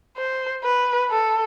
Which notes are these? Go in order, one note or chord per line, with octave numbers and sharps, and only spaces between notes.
C5
B4
A4